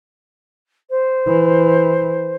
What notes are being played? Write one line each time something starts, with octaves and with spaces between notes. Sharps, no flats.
C5
E3